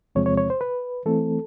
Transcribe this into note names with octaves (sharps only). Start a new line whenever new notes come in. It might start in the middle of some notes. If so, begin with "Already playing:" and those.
E2 C3 F3 G#3 C4 C#5
C#5
C#5
C5
B4
E3 A3 C4 A4